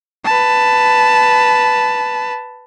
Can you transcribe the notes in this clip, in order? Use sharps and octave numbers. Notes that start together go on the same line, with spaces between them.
B4 A5